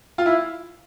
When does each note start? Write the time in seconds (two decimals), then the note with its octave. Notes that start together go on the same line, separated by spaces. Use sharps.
0.18 F4
0.26 E4